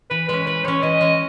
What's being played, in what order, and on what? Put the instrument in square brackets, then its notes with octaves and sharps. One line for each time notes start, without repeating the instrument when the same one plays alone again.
[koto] E3 [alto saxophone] B4
[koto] G#3 C#4 [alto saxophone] B4
[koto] E3 [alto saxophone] B4
[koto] G#3 C#4 [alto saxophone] C#5
[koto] E3 [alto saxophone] D#5
[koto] G#3 C#4